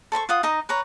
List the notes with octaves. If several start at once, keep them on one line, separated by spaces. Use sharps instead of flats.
A4 C5 B5 C#6
F4 F#5 D#6
D#4 D#5 A#5
B4 C#5 A#5